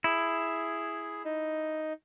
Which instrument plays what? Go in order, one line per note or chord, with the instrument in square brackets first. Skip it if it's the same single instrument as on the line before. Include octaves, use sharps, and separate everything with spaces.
[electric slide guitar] E4 [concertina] G#4
[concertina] D#4